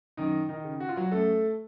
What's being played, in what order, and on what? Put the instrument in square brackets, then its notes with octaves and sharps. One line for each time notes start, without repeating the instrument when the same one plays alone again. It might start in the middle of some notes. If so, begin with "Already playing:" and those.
[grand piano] F#2 D#3 D#4
D#3 D#4
C#3
F#4
F4
F#3 F#4
F#2 A3 A4